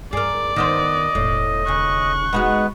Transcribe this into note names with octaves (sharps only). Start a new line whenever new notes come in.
G2 G#4 A#4 D5
D#3 B3 C5 D#5
E1 A2
D#2 C#3 C#6 F#6
G#3 B3 D#4 F#4 B4